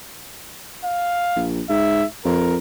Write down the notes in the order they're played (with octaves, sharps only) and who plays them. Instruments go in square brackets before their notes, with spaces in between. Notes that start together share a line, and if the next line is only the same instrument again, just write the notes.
[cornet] F5
[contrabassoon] A#1
[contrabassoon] G#2 [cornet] E5
[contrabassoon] F2 [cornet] A#4